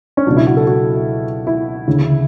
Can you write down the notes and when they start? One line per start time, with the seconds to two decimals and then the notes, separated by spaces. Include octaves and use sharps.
0.17 C#4
0.27 C#2 B2 F#3 D4
0.37 E4
0.47 F#4
0.57 A4
0.67 F#4
1.47 E4
1.87 D2 C#3 E3